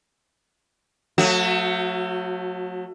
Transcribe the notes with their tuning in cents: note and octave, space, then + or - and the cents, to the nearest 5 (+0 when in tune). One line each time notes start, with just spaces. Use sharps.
F#3 -30 A3 +20 F#4 +0